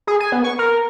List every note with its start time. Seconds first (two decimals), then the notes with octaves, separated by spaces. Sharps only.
0.07 G#4
0.20 G#5
0.32 B3
0.44 C#6
0.59 A#4